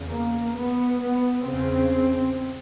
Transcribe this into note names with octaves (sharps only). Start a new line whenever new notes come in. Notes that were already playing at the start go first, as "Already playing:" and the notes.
Already playing: E2 C#3
A#3
B3
B3
E2 C#3 C4